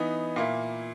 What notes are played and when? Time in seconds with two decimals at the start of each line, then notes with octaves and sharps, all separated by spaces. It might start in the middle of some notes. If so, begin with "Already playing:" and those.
Already playing: E3 B3 D#4
0.36 A#2 A#3 E4